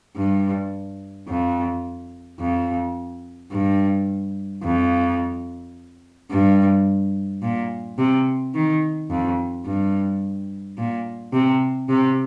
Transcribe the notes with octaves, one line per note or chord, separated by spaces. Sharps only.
G2
F2
F2
G2
F2
G2
A#2
C3
D#3
F2
G2
A#2
C3
C3